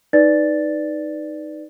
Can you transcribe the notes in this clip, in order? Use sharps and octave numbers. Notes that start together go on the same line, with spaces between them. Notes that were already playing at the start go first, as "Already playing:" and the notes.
D#4 B4 D5 A6